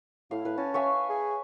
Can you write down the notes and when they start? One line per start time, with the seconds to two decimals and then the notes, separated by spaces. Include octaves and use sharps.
0.31 A2 E4 F5
0.45 A2 B4
0.58 C#4 A5
0.74 C#5 E5 F5 G#5
1.09 G#4